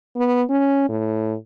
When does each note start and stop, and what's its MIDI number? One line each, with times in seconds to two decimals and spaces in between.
0.16 0.43 59
0.50 0.87 61
0.89 1.35 45